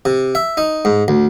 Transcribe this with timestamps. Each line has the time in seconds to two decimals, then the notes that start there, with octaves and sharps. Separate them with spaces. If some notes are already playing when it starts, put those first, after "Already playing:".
0.05 C3
0.35 E5
0.57 D#4
0.85 G#2
1.08 D2